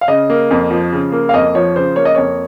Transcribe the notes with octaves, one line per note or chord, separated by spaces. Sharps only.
F5
C#3 D#5
A#3
F2
F3
C#3
A#3
F5
F2 D#5
F3 C#5
C#3 C5
A#3 C#5
D#5
F2 C#5